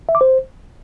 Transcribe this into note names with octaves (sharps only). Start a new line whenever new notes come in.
E5
D6
C5